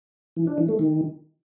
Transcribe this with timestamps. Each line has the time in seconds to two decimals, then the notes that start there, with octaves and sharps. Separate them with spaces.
0.36 E3
0.47 D4
0.58 E3
0.68 A3
0.79 D#3